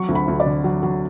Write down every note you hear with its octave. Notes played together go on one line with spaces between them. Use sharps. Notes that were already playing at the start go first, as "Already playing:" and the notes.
Already playing: F#3 C#6
D2
B5
D2
D5
D3
F#3
F#3